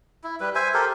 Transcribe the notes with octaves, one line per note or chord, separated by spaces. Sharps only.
E4
G3 B4
C5 E5 G#5
G4 A4 A#4 C5